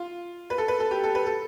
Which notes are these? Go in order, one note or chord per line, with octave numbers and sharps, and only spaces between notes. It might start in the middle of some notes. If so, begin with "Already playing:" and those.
Already playing: F4
B4
A4
B4
A4
G4
A4
B4
A4